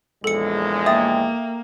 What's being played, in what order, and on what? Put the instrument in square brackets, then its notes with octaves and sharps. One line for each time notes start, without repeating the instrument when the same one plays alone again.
[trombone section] A#1 E2 G#3 [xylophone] A4 C#7
[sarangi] A#3 [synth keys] E5 G5 [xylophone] D#6 A6